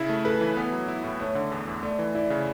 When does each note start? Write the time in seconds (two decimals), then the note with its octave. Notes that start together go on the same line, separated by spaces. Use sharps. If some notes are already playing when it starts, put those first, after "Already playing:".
Already playing: C#3 E4
0.09 A3
0.25 A4 B4
0.41 E3
0.57 B3
0.72 F#3
0.88 E4
1.04 A2
1.20 A3 C#5
1.35 D3
1.52 E2
1.67 E2
1.83 A3 D5
1.99 E3
2.15 E4 D5
2.30 C#3